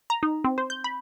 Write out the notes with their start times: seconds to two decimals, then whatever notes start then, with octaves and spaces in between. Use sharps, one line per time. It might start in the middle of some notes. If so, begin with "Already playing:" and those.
0.10 A#5
0.23 D#4
0.44 C4
0.58 C5
0.70 G6
0.84 B5